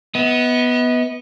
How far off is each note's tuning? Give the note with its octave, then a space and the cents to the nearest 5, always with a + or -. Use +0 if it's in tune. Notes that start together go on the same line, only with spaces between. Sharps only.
B3 +0 D#5 +45